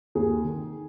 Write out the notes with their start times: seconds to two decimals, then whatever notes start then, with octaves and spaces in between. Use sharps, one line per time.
0.15 D#2 G#4
0.44 D#3